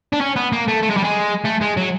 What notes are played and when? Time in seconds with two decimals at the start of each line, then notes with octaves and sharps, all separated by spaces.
0.13 D4
0.21 C#4
0.36 B3
0.53 A#3
0.68 A3
0.83 A3
0.90 G#3
0.97 G3
1.04 G#3
1.45 A3
1.61 G#3
1.77 F#3